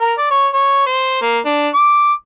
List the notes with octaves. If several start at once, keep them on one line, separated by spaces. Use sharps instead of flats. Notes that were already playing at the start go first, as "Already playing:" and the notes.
A#4
D5
C#5
C#5
C5
A#3
D4
D6